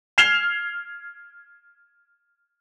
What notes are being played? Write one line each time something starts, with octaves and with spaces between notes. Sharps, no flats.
F6 G#6 C7 E7 F7 G7